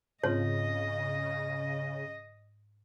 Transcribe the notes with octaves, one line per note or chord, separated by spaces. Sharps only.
G#2 C#3 C4 F4 C#5 D#5